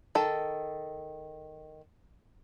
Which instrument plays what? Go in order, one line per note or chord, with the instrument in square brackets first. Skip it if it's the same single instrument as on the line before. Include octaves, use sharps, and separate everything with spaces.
[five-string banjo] D#3 A4